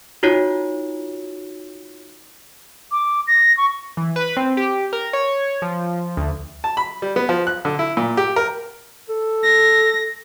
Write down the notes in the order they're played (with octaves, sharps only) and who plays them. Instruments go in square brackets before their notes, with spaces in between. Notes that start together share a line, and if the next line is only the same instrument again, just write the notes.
[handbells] D#4 F4 F#4 C#5
[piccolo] D6
A#6
C#6
[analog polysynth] E3
B4
C4
G4
A#4
C#5
F3
D2
[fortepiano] A5
B5
G3
B3
F3
F#6
D3
E4
A#2
G4
A#4
[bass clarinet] A4
[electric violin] A#6